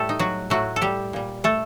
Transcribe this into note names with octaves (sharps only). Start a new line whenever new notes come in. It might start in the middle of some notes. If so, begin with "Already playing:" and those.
Already playing: A2 G3 A3 G4 A4
D#4
F#3 F#4
A2 F#3 A3 F#4
A4
G3 G4
A#2 G3
A3 A4